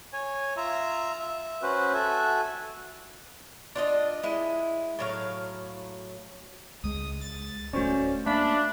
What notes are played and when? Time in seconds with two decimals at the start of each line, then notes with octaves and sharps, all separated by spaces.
0.13 C#5 G#5
0.57 F4 E5 A#5
1.19 E5
1.62 C#4 F#4 B4 C5
1.94 F#4 A4 E5 G#5
3.75 D4 F4 D#5
4.23 G#3 E4
4.99 A2 F#3 F5
6.84 C#2 G#3 D#6
7.21 A6
7.73 D1 A3 C#4 F#4 C5 D5
8.26 A3 A#3 D4 E5 F5 B5